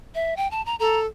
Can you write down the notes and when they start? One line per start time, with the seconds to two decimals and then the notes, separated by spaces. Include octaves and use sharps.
0.15 E5
0.37 G5
0.51 A5
0.66 A#5
0.80 A4 A#5